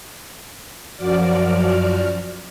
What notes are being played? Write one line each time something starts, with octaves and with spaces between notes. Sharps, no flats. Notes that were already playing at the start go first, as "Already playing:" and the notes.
F#2 F3 F#4 D5 D6 F6